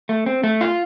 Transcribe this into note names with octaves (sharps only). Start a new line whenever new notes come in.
A3
C4
A3
F4